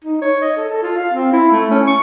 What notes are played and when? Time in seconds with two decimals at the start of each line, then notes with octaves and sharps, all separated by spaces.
0.04 D#4
0.22 C#5
0.42 D#5
0.57 A4
0.69 A4
0.82 F4
0.97 F5
1.14 C4
1.33 E4
1.52 A3
1.71 C#4
1.87 C#6